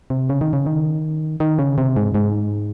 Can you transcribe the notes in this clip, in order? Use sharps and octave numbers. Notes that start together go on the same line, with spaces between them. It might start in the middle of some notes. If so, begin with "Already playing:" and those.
C3
C#3
D#3
C#3
D#3
D#3
C#3
C3
G#2
G#2